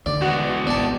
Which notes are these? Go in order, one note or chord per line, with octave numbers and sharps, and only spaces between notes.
D2 D3 D#3 D5
E2 G#3 F#4
G#1 F2 B3 D5 A5